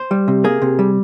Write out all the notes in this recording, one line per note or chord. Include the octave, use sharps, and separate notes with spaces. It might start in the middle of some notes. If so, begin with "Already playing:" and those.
Already playing: C5
G3
C3
A#3 G#4
C3
G3